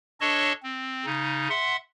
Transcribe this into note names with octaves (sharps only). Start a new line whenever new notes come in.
D4 A4 C#5 D#5 A5 C#6
C4
C#3 D#4
E5 F#5 C6